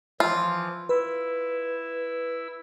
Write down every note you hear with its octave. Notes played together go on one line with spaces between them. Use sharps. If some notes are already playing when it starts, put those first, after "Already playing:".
E3 F3 F4
E4 B4 E6